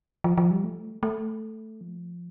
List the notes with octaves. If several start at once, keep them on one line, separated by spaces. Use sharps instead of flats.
F3
F3
G3
A3
A3
F3